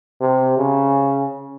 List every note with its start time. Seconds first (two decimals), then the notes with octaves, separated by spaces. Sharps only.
0.21 C3
0.58 C#3